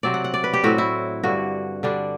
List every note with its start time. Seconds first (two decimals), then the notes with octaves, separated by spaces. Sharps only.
0.03 C3 F#3 C4 D5
0.14 F#5
0.24 F#5
0.34 D5
0.44 B4
0.53 G4
0.64 A2 F#3 C4 F#4
0.78 E4
1.23 G2 D3 G3 F#4
1.83 D3 G3 D4